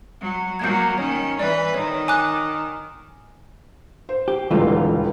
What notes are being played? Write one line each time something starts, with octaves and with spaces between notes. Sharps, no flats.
F#3
F#3 A#3 G6 G#6
D#3 C#4 C#5
E3 B4 D5
D#3 C#5
G#5 D6 F#6
C5
G4
D#1 C#2 D3 E3 F4